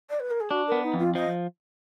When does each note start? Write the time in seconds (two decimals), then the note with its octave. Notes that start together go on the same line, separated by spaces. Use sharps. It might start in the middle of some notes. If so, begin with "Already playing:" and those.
0.09 D5
0.19 B4
0.30 A#4
0.40 G#4
0.50 D4 F#4
0.67 B3 A#4
0.82 D#4
0.94 F2 F4
1.15 F3 D#5